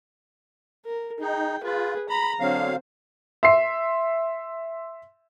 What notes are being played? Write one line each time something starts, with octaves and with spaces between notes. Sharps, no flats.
A#4
D#4 G#4 G5
F4 G#4 B4
A#5 B5
D3 F#3 C4 F5
E5 C6 C7